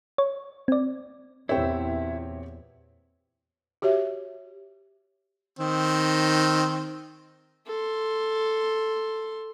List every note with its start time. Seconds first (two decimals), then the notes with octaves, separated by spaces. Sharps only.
0.18 C#5
0.68 C4 D5
1.49 E2 A#2 C4 E4 G4 C#5 E5 G5
3.82 F#4 G4 C#5 E5
5.59 D#3 C4
7.67 A4 C6